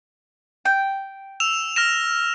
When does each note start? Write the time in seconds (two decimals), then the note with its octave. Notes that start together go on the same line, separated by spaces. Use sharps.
0.65 G5
1.40 E6 E7 F7
1.76 F6 A#6 E7